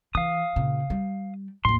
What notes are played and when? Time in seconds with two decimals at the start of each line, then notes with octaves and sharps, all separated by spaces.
0.15 E3 F5 D#6
0.56 A#2 C#3
0.90 G3
1.65 D#2 A2 C6